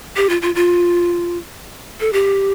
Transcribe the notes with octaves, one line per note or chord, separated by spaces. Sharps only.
G4
F4
F4
F4
A4
G4